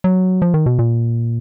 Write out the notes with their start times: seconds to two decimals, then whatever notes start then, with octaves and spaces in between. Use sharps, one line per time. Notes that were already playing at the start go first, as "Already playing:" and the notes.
0.04 F#3
0.42 F3
0.54 D#3
0.66 B2
0.79 A#2